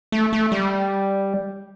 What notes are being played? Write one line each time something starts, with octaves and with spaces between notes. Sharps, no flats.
A3
A3
G3